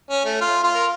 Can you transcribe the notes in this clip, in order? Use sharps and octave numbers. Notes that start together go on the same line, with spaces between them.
C#4
A3
F4
F4
A#4